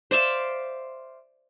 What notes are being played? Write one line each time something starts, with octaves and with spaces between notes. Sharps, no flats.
C5 D5 E5 F5